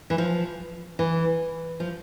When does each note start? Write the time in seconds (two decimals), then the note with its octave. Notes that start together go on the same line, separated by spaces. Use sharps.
0.10 E3
0.18 F3
0.99 E3
1.80 F3